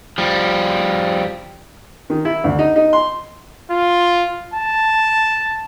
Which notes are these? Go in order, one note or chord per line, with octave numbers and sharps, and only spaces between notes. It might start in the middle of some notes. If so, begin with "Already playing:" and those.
F3 G3
D#3
E4
D2
D#4
D#4
C6
F4
A5